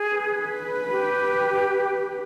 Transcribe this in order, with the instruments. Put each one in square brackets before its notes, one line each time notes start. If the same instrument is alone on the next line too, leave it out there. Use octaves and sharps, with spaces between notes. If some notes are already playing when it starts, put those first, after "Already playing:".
Already playing: [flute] G#4
[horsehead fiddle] B4
[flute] G4